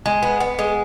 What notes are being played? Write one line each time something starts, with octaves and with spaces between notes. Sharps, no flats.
G#3
B3
B3
G#3